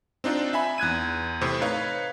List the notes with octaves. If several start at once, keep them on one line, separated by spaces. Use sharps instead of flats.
C4 D4 D#4 F4
E5 G#5 B5
E2 F#6 G#6 D#7
A2 C3 C4
D#4 B4 C#5 F5